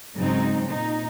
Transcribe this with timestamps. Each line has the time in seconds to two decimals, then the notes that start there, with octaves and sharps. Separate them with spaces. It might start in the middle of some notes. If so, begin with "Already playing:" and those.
0.16 G#2 C#3 F#3 C4 D#4
0.67 A#2 D#4